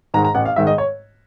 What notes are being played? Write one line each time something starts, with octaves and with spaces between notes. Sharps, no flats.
G#2 D#3 G#3 A#5
A#5
A1 F#5
F5
G#2 D#3 G#3 E5
D#5
C#5